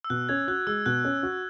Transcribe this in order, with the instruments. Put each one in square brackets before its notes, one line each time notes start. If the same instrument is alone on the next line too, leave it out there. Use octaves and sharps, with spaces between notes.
[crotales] E6
[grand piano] B2 [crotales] F#6
[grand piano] C#4 [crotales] G#6
[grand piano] F#4 [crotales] F#6
[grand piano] G#3 [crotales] E6
[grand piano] B2 [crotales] F#6
[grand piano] C#4
F#4